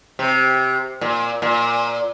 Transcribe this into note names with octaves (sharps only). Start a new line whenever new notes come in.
C3
A#2
A#2